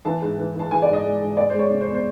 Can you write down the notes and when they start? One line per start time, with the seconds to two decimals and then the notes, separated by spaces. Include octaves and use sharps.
0.05 E3 A5
0.21 G#2
0.38 E3
0.55 E3 A5
0.71 E3 G#5
0.82 D5
0.88 G#2
0.93 D#5
1.04 G#3
1.21 G#2
1.37 G#3 D5
1.50 G#3 C5
1.59 C#5
1.70 C3
1.81 C5
1.86 E2
1.94 C5